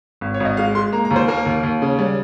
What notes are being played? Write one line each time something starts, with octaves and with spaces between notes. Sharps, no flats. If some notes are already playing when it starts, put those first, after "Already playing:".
G#1
C#5
G#1
D#5
G#3 F5
G#3 C6
A#3 A#5
A#5
D#2
C5
A#3 A#4
D#2
D#2
C#3
G3